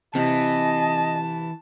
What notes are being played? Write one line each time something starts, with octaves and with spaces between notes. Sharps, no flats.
C3 E3 D#5 A5